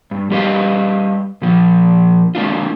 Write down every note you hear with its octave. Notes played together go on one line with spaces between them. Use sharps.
G2
G3 G4 B4 D#5 F5
A#2 F3
G#3 A#3 D4 F4